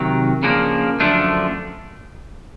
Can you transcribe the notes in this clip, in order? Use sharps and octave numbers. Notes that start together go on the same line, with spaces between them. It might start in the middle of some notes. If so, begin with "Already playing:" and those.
Already playing: C3 D#3 F#3
C#3 F3 A#3 D4
F#2 D3 F3 A3 D4